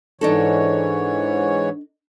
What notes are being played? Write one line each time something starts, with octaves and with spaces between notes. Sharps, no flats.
G#2 E3 D4 D#4 A4 C#5